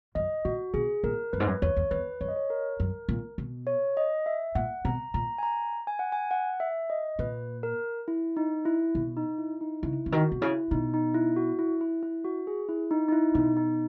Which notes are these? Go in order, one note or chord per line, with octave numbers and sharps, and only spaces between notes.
F#2 D#5
A#2 F#4
B2 G#4
A#2 A#4
F#2 B4
G#2
F#2
E2 C#5
E2
E2 B4
F#2 C#5
D#5
C#5
A#4
F#2
A#2
B2
C#5
D#5
E5
A#2 F#5
B2 A#5
A#2 A#5
G#5
A#5
G#5
F#5
G#5
F#5
E5
D#5
A#2 B4
A#4
E4
D#4
E4
B2
D#4
E4
D#4
C#3 E4
C#3
D#3 F#4
B2
C#3 E4
B2 D#4
D#4
E4
F#4
E4
E4
E4
F#4
G#4
E4
D#4
D#4
E4
B2 D#4
D#4